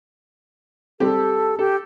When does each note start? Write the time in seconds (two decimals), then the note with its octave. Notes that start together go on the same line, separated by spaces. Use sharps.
1.00 G3 C4 G4 A4
1.59 G4 A4